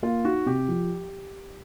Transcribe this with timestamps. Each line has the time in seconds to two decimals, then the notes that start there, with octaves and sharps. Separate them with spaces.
0.03 A#3 F4
0.25 D#4 F#4
0.46 C3 G4
0.68 F3